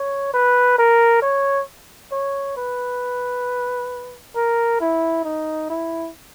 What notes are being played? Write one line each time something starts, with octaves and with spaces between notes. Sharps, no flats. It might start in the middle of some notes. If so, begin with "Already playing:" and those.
Already playing: C#5
B4
A#4
C#5
C#5
B4
A#4
E4
D#4
E4